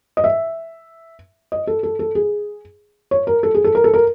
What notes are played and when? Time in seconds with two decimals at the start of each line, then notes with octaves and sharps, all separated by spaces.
0.17 D#5
0.24 E5
1.52 D#5
1.67 A4
1.83 A4
1.99 A4
2.15 G#4
3.11 C#5
3.27 A#4
3.43 A4
3.55 G#4
3.64 A4
3.75 A#4
3.84 A4
3.94 A#4